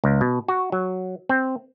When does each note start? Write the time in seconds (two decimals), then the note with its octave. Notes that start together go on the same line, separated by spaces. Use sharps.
0.04 C#2
0.21 B2
0.48 F#4
0.72 F#3
1.29 C4